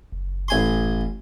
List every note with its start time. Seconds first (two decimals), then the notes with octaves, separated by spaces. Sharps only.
0.12 F#1
0.48 A1 G#5 C6